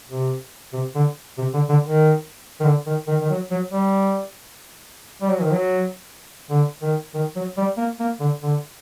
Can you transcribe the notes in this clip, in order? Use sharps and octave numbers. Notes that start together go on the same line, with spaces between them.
C3
C3
D3
C3
D3
D3
D#3
D#3
D3
D#3
D#3
D#3
F#3
F#3
G3
G3
F#3
D#3
F#3
D3
D#3
D#3
F#3
G3
A#3
A#3
D3
D3